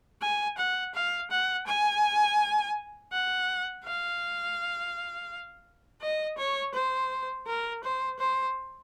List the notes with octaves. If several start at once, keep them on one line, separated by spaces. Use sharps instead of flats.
G#5
F#5
F5
F#5
G#5
F#5
F5
D#5
C#5
C5
A#4
C5
C5